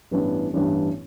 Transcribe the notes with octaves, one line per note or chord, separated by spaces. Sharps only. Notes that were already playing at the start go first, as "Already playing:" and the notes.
A1 G2 E3 B3 D4
A1 G2 E3 B3 D4